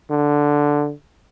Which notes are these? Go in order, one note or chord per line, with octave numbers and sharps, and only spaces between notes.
D3